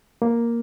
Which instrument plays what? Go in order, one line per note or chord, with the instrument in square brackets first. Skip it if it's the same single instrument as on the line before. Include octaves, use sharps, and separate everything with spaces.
[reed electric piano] A#3